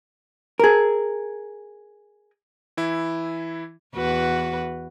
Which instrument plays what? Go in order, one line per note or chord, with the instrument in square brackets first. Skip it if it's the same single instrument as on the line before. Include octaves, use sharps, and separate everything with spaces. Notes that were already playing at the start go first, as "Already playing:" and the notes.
[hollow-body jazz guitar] G#4 A#4
[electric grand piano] E3 E4
[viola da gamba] E2 F#4 B4